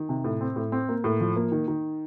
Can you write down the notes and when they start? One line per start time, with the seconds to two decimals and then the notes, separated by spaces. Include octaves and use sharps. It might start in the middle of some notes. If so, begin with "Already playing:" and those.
Already playing: D#3
0.09 C3
0.24 A2
0.41 C4
0.56 A2
0.72 C4
0.89 A#3
1.04 A2
1.20 F3
1.36 A#3
1.52 D#3
1.68 D#3